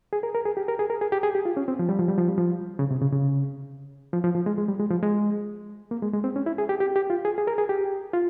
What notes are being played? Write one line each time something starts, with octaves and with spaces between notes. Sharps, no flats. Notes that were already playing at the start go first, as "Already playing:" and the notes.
G#4
A#4
A#4
G#4
G4
A#4
G#4
A#4
G#4
G4
G#4
G4
F4
C#4
C4
F3
G3
F3
G3
F3
G3
F3
C#3
C3
C#3
C#3
F3
F3
F3
G#3
G#3
G3
G#3
F3
G#3
A#3
G#3
G#3
C4
C#4
E4
G#4
G4
G4
G4
F4
G#4
G#4
A#4
G#4
G4
F4